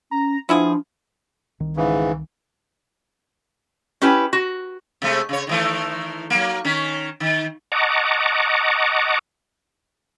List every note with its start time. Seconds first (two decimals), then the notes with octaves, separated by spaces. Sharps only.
0.11 C#4 A#5
0.49 F3 B3 D4 E4 G#4
1.60 C2 D#3
1.77 G#2 C#3 E3
4.02 C#4 E4 G4 B4
4.33 F#4
5.02 C3 G#3 A3
5.29 C#3 C#5
5.47 D#3 E3 A3
6.30 F#3 A#3
6.65 D#3 C#4
7.20 D#3
7.72 D#5 F#5 A5 A#5 C#6 D6